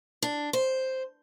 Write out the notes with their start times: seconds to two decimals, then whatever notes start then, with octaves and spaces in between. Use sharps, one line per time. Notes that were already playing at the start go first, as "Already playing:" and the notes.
0.22 D4
0.53 C5